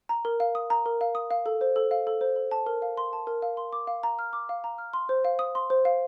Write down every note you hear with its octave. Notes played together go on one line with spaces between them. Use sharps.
A#5
A#4
F5
D#6
A#5
A#4
F5
D#6
F5
A4
C5
A4
F5
A4
C5
A4
A5
A#4
F5
C6
A5
A#4
F5
C6
D6
F5
A#5
F6
D6
F5
A#5
F6
C6
C5
F5
D#6
C6
C5
F5